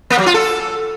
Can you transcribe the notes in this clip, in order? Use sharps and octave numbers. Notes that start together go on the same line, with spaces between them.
A#3
F#3
F4
A4